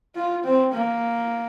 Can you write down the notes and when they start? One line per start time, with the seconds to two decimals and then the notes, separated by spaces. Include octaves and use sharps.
0.16 F4
0.44 C4
0.73 A#3